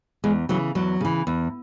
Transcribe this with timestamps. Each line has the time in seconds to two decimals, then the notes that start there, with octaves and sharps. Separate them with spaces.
0.24 E2 G#3
0.49 C#3 E3 F#3
0.75 E2 F#3
1.01 C#3 E3
1.27 E2